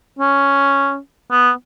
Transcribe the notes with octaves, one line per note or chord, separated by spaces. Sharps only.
C#4
B3